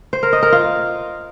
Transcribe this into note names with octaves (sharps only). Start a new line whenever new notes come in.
C5
A#4
D#5
A#4
F4